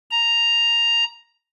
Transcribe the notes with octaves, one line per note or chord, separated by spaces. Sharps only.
A#5